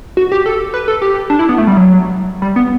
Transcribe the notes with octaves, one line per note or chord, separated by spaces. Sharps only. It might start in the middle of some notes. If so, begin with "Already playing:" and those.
F#4
G4
A4
B4
A4
G4
D4
E4
B3
A3
G3
F#3
G3
B3